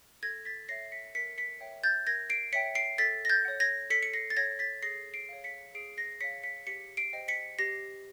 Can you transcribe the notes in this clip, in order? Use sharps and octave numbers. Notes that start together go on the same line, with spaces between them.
A4 G#6 A#6
A6 B6
C#5 E5 A#6 C7
B6 C#7
A#4 B6 C#7
B6 C#7
C#5 E5 G5
G6 A6
A#4 G#6 A#6
C7 D7
C#5 E5 G5 B6 C#7
C7 D7
A4 A6 B6
A#6
G6 A6
C#5 F#5
G#6 A#6
A4 B6 C#7
C#7
A#6 C7
A6
C#5 F#5 G#6 A#6
A6 B6
G#4 A#6 C7
C7 D7
C#5 F5
B6 C#7
G#4 C7 D7
A#6 C7
C#5 F5 B6 C#7
B6 C#7
G4 B6 C#7
C7 D7
C5 D#5 G5
B6 C#7
G4 A#6 C7